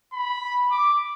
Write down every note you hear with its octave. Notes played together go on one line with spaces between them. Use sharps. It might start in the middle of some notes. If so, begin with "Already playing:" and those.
B5
D6